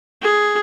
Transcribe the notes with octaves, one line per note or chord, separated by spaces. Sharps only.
G#4